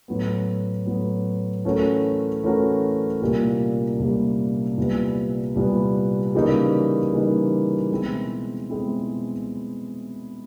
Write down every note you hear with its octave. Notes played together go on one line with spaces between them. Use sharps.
A2 F#3 B3
A2 F#3 B3
E3 A3 C#4 F#4 A#4
E3 A3 C#4 F#4 A#4
C2 A#2 G3 A#3
C2 A#2 G3 A#3
C2 A#2 G3 B3
C2 A#2 G3 B3
C#3 E3 G3 A#3 D#4
C#3 E3 G3 A#3 D#4
B2 G#3 C4 E4
B2 G#3 C4 E4